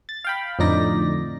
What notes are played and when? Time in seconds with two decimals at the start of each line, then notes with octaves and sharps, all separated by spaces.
0.09 A6
0.24 F5 G5 B5
0.59 F2 A2 D3 D#4 D5 A#6